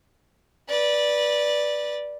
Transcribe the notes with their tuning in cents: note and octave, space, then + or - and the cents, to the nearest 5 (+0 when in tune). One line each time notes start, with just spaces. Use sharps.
B4 -20 D5 +0